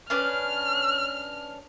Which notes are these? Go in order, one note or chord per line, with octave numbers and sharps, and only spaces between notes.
C#4 D4 B4 F6